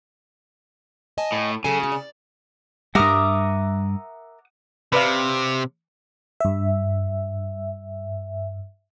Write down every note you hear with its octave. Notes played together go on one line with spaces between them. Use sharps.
D#5 G#5 A5
A2
C#3 F#3 A4 G#5
C#4 F#4
D5
G2 G3 A#4 E5 F#5 A#5 D6 D#6
C3 B4 D5 F5
G2 E5